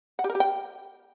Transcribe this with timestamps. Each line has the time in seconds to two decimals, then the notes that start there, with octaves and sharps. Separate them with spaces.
0.19 F#5
0.24 G4
0.30 A#4
0.35 G4
0.40 G5